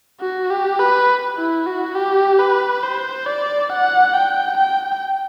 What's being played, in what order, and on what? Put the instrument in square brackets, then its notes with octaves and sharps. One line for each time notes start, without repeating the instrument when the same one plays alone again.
[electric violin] F#4
G4
B4
E4
F#4
G4
B4
C5
D5
F#5
G5
G5